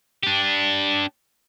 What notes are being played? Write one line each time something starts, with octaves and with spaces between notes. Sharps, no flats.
D4 G4